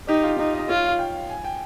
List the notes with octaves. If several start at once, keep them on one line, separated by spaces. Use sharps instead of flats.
D#4 G4
F4
D#4
D#5
F4 C#5
F5
G5
G#5
G5